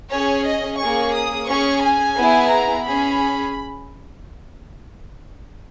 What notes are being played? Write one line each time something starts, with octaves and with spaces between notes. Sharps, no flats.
C#4 G#4 C#5
D#5
A#3 C#4 G#4 C#6
D#6
C#4 G#4 C#6
G#5
B3 E4 G#4
A#5
C#4 G#4 B5